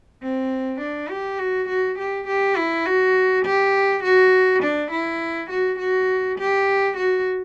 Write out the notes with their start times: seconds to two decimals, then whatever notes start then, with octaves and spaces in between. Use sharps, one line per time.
0.22 C4
0.80 D4
1.10 G4
1.39 F#4
1.68 F#4
1.98 G4
2.27 G4
2.56 E4
2.86 F#4
3.45 G4
4.03 F#4
4.62 D4
4.91 E4
5.50 F#4
5.79 F#4
6.38 G4
6.97 F#4